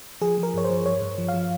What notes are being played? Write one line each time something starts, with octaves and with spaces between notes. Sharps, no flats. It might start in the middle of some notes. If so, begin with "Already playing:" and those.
F3 G#4
F3
A#4
G2 C#5
C5
F3
G2 C#5
G2
F3
F5
F3